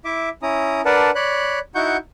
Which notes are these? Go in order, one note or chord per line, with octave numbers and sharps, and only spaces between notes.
E4 E5 D6
C#4 E4 A#5 D#6
D4 A#4 B4 D5 F#5 A5
C#5 D5 B5 F#6
D#4 E4 F#4 F#5 C#6 G6